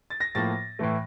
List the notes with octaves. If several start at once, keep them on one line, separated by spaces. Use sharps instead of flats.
A6
A#6
A2 F3 A#3 A6
A2 E3 A3